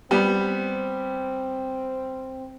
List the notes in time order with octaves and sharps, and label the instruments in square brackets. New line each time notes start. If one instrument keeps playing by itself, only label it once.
[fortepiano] G3 B3 [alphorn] C4